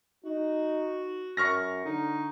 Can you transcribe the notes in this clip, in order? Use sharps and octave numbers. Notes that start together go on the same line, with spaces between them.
D#4 F#4
F#2 C#6 F6 A#6
D3 D#4